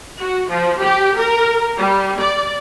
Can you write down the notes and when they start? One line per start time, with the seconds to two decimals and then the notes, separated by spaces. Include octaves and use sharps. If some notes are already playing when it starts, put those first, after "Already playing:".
0.20 F#4
0.49 F3
0.82 G4
1.17 A#4
1.78 G3
2.21 D5